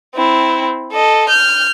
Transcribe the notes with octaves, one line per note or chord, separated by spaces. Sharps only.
C4 E4
A4 D#5
F6 G6